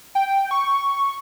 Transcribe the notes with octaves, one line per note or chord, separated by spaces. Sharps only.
G5
C#6